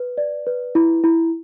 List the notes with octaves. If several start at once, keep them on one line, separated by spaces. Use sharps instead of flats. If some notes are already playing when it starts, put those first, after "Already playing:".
Already playing: B4
D5
B4
E4
E4